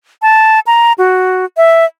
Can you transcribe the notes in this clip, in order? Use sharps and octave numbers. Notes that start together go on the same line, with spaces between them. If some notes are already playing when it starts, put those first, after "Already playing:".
A5
A#5
F#4
E5